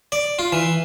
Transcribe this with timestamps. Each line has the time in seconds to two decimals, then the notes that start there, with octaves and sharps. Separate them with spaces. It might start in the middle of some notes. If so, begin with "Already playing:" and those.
0.12 D5
0.39 F4
0.52 E3